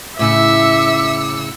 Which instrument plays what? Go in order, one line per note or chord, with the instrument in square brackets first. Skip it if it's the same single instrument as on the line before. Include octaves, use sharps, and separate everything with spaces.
[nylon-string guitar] A2 C#3 [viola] E5 [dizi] D6 [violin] E6 C#7